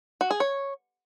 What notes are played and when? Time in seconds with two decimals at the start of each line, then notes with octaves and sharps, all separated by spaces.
0.21 F#4
0.31 G#4
0.40 C#5